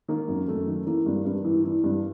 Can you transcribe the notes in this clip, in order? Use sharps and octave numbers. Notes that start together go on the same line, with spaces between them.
D#3 A#3
F#2
F#2 A3
D#3
E3 A#3
G2
G2
E3
E3
G2